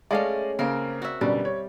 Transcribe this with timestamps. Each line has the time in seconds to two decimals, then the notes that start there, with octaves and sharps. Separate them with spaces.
0.11 G#3 A3 C#4 D5 D#5 F5
0.59 C#3 A#3 C4 C#4 A#4
1.02 F#4 E5
1.21 F#2 B2 D3 G3
1.45 C#5